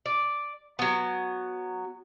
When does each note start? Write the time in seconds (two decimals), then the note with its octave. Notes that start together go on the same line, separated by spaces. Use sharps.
0.06 D5
0.79 F#3 B3